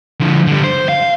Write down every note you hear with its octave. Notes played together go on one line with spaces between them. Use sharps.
D3 F3
D3 G3
C5
F5